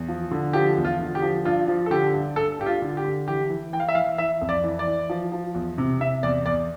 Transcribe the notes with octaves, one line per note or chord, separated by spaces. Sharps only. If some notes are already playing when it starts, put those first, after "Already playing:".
Already playing: E2
F3
D3
F3 G4
E2
F4
D3
G4
F3
G2 F4
F3
A4
D3 G4
G2
G2 A4
G2 G4
F4
D3
G4
D3
E3 G4
E3
E3 G5
F5
E5
E3 F5
E3 E5
F2
D5
E3
D5
E3
F3
F3
E2
C3
C3 E5
E2 D5
E2 D5